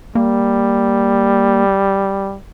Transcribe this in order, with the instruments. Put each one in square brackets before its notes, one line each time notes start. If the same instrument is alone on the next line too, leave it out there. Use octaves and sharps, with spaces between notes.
[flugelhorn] G3 [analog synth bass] A#3